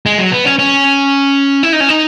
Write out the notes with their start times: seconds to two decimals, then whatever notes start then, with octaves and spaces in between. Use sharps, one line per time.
0.06 G#3
0.18 F#3
0.32 B3
0.45 C#4
0.59 C#4
1.63 E4
1.73 D#4
1.80 C#4
1.89 D#4